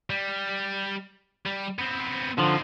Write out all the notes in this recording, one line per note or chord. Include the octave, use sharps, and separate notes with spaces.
G3
G3
B3 C4
D3 D#3 F3 C4